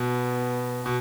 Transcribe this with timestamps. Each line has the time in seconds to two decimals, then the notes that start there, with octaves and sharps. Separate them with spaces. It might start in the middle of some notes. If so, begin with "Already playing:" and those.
Already playing: B2 B3
0.86 B2